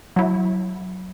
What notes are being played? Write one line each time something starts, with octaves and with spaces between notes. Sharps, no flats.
F#3 E4